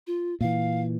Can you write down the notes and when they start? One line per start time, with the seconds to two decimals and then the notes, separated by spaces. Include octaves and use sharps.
0.07 F4
0.41 A#2 E3 F5